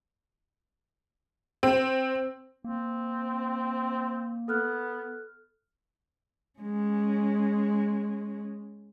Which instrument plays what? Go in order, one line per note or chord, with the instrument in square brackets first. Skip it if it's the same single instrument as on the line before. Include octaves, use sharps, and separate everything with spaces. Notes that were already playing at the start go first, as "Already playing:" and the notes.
[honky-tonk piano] C4
[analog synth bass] A#3 [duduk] C4
[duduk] B3 [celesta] A4 F6 F#6
[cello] G#3 C#4